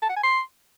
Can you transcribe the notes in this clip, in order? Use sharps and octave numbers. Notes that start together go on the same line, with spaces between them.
A5
F#5
G#5
C6